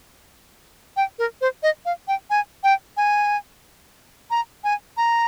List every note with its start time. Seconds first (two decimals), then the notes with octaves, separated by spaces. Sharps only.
0.97 G5
1.19 A#4
1.41 C5
1.63 D#5
1.85 F5
2.08 G5
2.30 G#5
2.63 G5
2.97 G#5
4.31 A#5
4.64 G#5
4.97 A#5